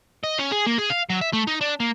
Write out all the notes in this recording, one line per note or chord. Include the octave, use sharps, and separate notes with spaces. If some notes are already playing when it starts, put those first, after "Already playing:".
D#5
C#4
G#4
A#3
G#4
F5
F#3
E5
A3
D#4
D4
A#3